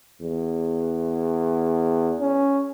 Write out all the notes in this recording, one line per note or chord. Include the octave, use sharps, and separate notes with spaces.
E2
C#4